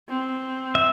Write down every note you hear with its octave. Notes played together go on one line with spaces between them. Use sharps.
C4
E5